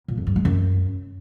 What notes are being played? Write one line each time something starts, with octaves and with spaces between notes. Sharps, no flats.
A#2
F2
G2
G#3
F#2